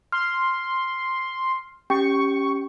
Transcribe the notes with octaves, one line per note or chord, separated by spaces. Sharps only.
C6 F6
C#4 G4 G5 C#6